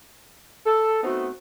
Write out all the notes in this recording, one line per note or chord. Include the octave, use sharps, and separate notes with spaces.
A4
A3 B3 C4 D#4 F#4